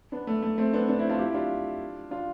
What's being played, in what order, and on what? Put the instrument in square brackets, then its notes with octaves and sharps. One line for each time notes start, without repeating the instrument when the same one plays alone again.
[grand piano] B3 D4
A3
A3
A3 C4
B3 D4
B3 D4
C4 E4
D4 F4
E4 G4
D4 F4
D4 F4